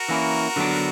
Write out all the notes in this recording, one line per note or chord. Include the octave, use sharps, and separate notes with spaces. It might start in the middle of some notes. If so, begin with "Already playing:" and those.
Already playing: F#4 A#4
E3 A#3 C#4 E4
D3 F#3 B3 D4